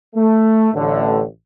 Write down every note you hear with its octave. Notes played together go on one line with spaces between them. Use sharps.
A3
A1 A2 D3